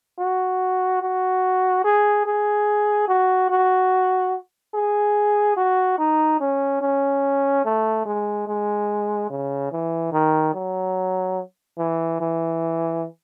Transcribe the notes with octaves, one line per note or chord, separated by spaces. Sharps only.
F#4
F#4
G#4
G#4
F#4
F#4
G#4
F#4
D#4
C#4
C#4
A3
G#3
G#3
C#3
E3
D#3
F#3
E3
E3